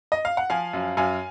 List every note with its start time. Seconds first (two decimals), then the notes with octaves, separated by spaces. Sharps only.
0.12 D#5
0.25 F5
0.37 F#5
0.50 F3 F5 G#5
0.73 F#2
0.97 F#2 F5 G#5